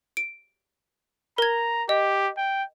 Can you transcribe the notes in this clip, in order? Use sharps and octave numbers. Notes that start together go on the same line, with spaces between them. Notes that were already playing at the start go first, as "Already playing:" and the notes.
D7
A#4 A#5 G#6
G4 D#5
G5